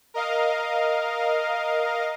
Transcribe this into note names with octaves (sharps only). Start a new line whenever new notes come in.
A#4 D#5 F5